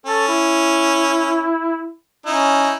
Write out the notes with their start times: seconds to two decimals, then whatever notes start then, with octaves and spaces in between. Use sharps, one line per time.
0.06 C#4 A4
0.28 E4
2.26 C#4 D#4 E4